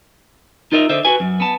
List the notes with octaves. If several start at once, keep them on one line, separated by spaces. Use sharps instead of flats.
D#4 F4 A#4 D#5 E5
D3 C5 D#5 E5
F#4 B4 G#5
F#2
B3 A5